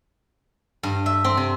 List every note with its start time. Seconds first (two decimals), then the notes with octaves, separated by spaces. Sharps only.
0.83 G2
1.06 E5
1.24 C4
1.37 C3